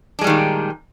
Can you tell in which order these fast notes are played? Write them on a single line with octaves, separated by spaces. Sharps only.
D4 G#3 G3 D#3 A#2